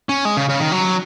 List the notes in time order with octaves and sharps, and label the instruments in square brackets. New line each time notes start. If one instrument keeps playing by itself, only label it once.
[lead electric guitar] C#4
G#3
C#3
C#3
D#3
F#3